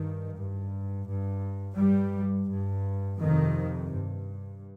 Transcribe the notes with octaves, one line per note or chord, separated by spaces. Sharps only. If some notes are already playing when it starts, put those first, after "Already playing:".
Already playing: G2 D#3
G2
G2
G2 G3
G2
F2 C3 D#3
G2